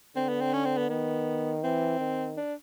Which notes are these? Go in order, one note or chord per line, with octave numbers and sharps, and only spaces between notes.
D3 C4
B3
C4
C#4
C4
B3
D#3 B3
E3 C4
D#3
D4